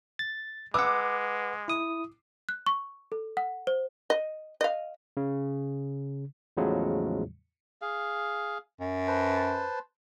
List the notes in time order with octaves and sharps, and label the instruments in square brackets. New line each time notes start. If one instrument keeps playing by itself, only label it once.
[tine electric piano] A6
[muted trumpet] G#3 [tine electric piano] B4 F#5 [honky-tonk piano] D6 E6
[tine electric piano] E4 D#6
[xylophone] F#6
C#6
A4
F#5
C5
[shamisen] D#5
D#5 F5
[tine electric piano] C#3
E2 A2 C#3 F3 F#3 G#3
[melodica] G#4 F5
[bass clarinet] F#2
[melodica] B4 C5 A5